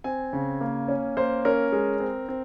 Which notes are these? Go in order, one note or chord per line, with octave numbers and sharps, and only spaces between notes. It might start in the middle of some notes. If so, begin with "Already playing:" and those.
C4 G#5
C#3
A#3
C#4
A#3 C5
C#4 A#4
G#3
C4
C4